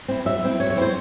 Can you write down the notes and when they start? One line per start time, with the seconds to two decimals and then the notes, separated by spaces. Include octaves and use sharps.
0.08 C4 E4
0.25 F#3 E5
0.42 C4 E4
0.59 F#3 C#5
0.70 C#5
0.77 C4 E4 C5